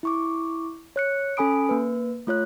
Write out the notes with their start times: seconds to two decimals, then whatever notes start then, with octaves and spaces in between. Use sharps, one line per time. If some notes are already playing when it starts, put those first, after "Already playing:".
0.03 E4 C#6 D6
0.96 C#5 F#6 C#7
1.37 C#4 A4 G#5 B5 D#6 D7
1.69 A#3 B4
2.27 A3 F4 C#5 F#6